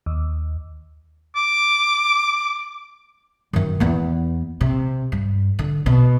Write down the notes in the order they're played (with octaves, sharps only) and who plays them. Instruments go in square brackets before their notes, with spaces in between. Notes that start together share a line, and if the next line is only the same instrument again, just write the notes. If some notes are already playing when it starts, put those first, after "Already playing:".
[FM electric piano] D#2
[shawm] D6
[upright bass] F#2 D#3
E2 B3
C3
G2
D3
B2